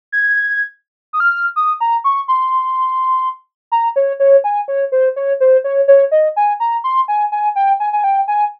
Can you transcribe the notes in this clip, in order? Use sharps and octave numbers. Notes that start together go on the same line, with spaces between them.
G#6
D#6
F6
D#6
A#5
C#6
C6
A#5
C#5
C#5
G#5
C#5
C5
C#5
C5
C#5
C#5
D#5
G#5
A#5
C6
G#5
G#5
G5
G#5
G#5
G5
G#5